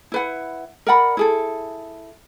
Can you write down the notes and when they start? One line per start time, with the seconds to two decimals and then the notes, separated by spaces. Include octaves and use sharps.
0.12 E4 B4 F#5
0.87 A#4 D5 F#5 B5
1.17 E4 G#4 A4